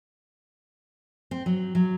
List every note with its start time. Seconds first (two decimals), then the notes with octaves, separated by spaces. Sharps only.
1.31 C4
1.46 F#3
1.75 F#3